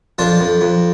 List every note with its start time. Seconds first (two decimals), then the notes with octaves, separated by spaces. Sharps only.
0.18 F2 D4 F4
0.40 F2
0.61 F2